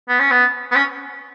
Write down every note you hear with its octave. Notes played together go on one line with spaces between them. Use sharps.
B3
C#4
B3
B3
C#4